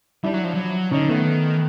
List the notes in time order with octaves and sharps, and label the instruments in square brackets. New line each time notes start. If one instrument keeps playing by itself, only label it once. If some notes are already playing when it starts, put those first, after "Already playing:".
[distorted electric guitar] G3 [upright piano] D4 E4
[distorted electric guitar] F#3
F3
F#3
[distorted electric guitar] D3 [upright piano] C#4 D#4
[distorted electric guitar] D#3 [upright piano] A3 B3